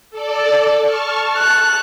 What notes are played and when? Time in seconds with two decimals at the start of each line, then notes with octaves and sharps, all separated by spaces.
0.11 A4 D5
0.82 A5 C#6 F6
1.38 F#6